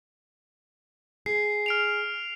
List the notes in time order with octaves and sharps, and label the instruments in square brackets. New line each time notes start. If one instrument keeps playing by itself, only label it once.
[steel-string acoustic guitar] G#4 [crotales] C7
[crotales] F6 D7 F7